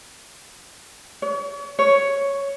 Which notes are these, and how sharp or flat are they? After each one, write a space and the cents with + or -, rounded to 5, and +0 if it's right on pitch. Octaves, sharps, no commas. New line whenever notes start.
C#5 +40
C#5 +5